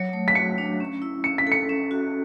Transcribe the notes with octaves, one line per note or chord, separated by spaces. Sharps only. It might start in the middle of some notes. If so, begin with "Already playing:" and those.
Already playing: F#3 C#5 C#7
A3
B6
F#4 C#7
D4
C#4
E4
C#4 C#7
B6
A4 C#7
C#4
F#4